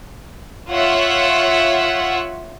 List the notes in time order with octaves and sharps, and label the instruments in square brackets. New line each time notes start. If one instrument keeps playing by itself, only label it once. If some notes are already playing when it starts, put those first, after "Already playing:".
[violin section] F4 C#5 E5 F#5